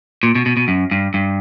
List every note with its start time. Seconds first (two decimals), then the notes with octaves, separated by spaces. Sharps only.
0.23 A#2
0.35 B2
0.46 B2
0.57 B2
0.68 F#2
0.91 G2
1.14 G2